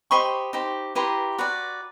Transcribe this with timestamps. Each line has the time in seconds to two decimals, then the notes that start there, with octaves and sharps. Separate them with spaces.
0.11 G4 C5 D#5 B5 C#6
0.53 D#4 G4 C5
0.95 E4 G4 B4 A#5 C6
1.38 F#4 B4 D5